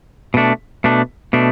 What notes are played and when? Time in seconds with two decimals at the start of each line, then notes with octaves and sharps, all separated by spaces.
0.34 B2 A3 D4
0.84 B2 A3 D4
1.33 B2 A3 D4